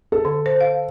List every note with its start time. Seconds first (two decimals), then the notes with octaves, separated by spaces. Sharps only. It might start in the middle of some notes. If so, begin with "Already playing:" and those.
0.12 A4
0.25 D3
0.46 C5
0.61 F5